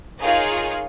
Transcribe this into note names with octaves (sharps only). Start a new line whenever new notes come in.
D#4 F4 G#4 A#4 C#5 F5